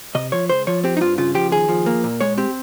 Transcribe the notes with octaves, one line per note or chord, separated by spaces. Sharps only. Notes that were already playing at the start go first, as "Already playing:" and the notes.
C3 D#5
F3 C#5
C#2 C5
F3 C#5
C4 G4
D#4
G2 F4
C#3 F4
F3 G4
D#2 G#4
F3
A#3
A#2
G#3 C#5
C4 G4